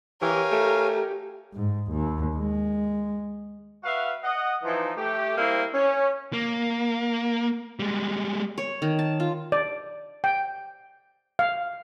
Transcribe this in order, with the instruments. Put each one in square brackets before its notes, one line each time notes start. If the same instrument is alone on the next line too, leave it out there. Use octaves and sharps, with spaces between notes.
[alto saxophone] E3 [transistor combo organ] G4 [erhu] A#4 [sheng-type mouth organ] C#5 F5 G#5
[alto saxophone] A3
[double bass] G#2
D#2
G#3
[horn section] F#4 B4 E5 F5
D#5 F#5
E3 F3 D#4
A3 G4
G3 A#3 C4 E4 A#4 C5
C#4
[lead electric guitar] A#3
G3 G#3
[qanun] C#5
D#3
A5
F4
[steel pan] D5
G5
F5